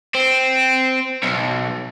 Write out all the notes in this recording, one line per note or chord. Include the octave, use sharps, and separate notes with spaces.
C4
B1